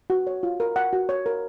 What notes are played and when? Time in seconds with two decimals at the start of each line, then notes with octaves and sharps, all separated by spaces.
0.10 F#4
0.27 C#5
0.43 F4
0.60 A#4
0.76 F#5
0.93 F#4
1.09 C#5
1.26 A#4